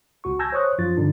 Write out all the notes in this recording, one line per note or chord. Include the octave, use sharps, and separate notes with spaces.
C#2 F#4 C#6
G#5 A5 E6 G6 G#6 A#6
C5 C#5 C#6 D#6 F#6
F#2 F3 F4 A6
G2 D3 D4 D#4